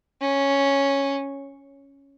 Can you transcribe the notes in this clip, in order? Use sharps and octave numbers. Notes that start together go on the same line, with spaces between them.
C#4